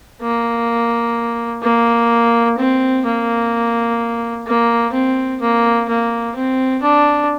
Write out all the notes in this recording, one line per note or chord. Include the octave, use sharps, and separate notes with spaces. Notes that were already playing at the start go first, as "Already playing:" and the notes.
A#3
A#3
C4
A#3
A#3
C4
A#3
A#3
C4
D4